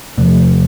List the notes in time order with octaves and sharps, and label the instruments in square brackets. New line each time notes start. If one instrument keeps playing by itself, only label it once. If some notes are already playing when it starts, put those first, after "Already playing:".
[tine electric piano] E2 C3 F3 A3